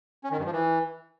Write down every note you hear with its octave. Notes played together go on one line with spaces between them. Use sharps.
C#4
D#3
G2
F3
E3